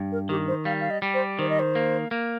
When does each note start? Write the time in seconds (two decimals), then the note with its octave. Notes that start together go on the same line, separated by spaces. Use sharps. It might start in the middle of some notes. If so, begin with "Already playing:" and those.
Already playing: G2
0.12 A#4
0.29 D#3 G4
0.48 C5
0.65 G3 F5
0.81 F5
0.91 D#5
1.02 G3
1.14 C5
1.39 D#3 C5
1.49 D#5
1.59 C5
1.75 A#3
2.11 A#3